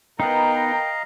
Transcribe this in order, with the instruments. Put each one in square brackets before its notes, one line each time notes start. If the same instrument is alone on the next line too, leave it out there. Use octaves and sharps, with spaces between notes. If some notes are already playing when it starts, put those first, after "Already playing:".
[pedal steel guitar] B3 D#4 [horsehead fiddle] A#4 B4 [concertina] D#5 F5 A#5 [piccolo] G5